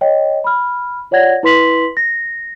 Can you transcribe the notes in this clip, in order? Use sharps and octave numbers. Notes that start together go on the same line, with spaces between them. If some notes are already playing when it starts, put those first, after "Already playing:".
C#5 D#5 G5
B5 F6
F4 C#5 D5 F#5 G#6 A#6
E4 B4 C6 B6 F#7
A#6